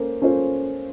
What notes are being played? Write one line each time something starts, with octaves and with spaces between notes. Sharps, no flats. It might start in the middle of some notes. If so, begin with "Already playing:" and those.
Already playing: A#3 C#4 A4 C5
C#4 F4 A4 C5